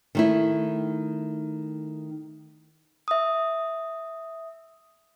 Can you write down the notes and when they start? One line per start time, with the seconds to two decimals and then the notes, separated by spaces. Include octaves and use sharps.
0.15 D#3 A3 E4
3.08 E5 D#6